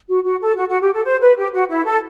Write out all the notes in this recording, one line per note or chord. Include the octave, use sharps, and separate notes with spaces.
F#4
F#4
A4
F#4
F#4
G4
A4
C5
B4
G4
F#4
E4
A4